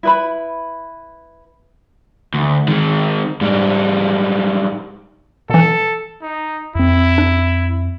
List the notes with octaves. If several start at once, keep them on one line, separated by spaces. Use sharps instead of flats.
E4 B4 B5
D2
D#3 G#3
G#2 G3
B2 E3 A4
D#4
F2 C4 E4
D4